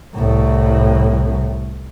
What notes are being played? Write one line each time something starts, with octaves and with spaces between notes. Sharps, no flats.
C2 A2